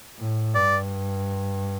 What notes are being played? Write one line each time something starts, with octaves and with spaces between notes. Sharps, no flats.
A2
G2 D5